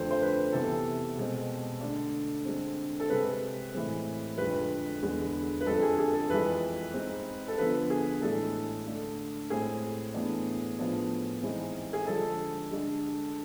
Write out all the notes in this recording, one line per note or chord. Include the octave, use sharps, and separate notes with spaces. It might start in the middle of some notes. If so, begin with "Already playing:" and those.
Already playing: F2 D3 A3 C5
C5
B4
C3 E3 B3 A4
B2 G#3 C4
D3 A3 D4
D3 G#3 C4
A4
C3 G#3 C4 B4
A2 E3 G#3 C4
F2 D3 G#3 B4
E2 D3 G#3 B3
B4
F2 D3 G#3 C4 A4
G#4
G#4
A4
F2 E3 G#3 B4
G#2 G#3 C4
A4
D3 F3 B3 B4
G#4
A2 E3 G#3 D4 A4
D3 A3 D4
A2 G#3 C4 G#4
A2 E3 B3 D4
A2 F3 B3 D4
G#2 E3 G#3 C4
G#4
D3 F3 G#3 D4 A4
D3 G#3 D4